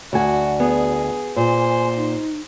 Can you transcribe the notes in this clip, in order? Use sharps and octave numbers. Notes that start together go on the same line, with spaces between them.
D2 F#4 D5 G#5
B3 G#4
A#2 C5 G#5
D#4